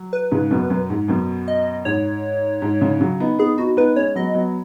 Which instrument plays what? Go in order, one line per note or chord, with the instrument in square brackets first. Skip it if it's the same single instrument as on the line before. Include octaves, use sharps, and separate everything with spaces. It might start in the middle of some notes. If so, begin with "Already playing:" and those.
Already playing: [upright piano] F#3
[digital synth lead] B4
[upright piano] G#2 C#3
F#2 B2
F#2
G#2
F#2 B2
[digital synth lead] D#5
[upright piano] G#2 [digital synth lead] C#5
[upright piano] G#2
G#2 C#3
C#3 F#3
B3 D#4
[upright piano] B3 D#4 [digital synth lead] G#4
[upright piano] B3 D#4 [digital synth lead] F#4
[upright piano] B3 D#4 [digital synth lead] B4
[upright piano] G#3 C#4 [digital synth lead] C#5
[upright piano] F#3 B3 [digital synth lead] D#5
[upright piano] F#3 B3